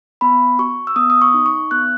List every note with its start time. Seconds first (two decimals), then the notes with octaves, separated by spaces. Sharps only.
0.21 B3 B5
0.59 F#4 C#6
0.87 E6
0.96 B3 D#6
1.10 D#6
1.22 C#6
1.34 D#4
1.46 C#6
1.71 B3 F#6